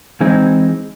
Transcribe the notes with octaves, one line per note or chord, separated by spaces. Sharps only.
E3 G#3 C4 D#4